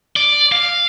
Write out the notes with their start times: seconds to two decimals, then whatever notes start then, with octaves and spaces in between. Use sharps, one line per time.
0.16 D5
0.52 F5